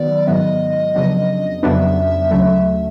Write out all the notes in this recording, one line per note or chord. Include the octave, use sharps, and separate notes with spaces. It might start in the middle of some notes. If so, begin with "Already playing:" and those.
Already playing: D#3 F#3 B3 D5
G#2 D#3 F#3 B3 D#5 E5
F2 C#3 F#3 B3 D4
F2 C#3 F#3 B3 D4 E5
D2 C#3 F#3 A3